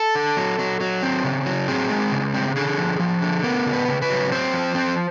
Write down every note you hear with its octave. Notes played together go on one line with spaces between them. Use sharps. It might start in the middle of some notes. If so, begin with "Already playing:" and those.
Already playing: A4
D3
F#3
F#3
F#3
C4
C#3
F#3
C4 G#4
G#3
C#3
C4
D3 G#4
F3
F3
D3
B3 A#4
C#3
B4
C#3
B4
F#3
C4 C5
F3
C4